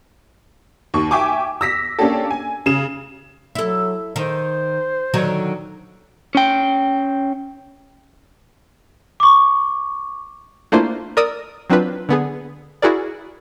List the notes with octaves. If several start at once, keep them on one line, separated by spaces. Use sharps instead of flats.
D#2 C#6
E5 G5 G#5 C#6 D6
E6 A#6 B6
A#3 C#4 D4 G4 A4
G#5
C#3 E7
F#3 E4 A4
D#3 C5
D3 D#3 F#3
C#4 G5
C#6 D6
A3 A#3 D4 E4 F4 C5
A#4 D5 D#6 E6
F#3 C4 D4 F4 B4
D3 B3 G#4
E4 F#4 G#4 A#4 D5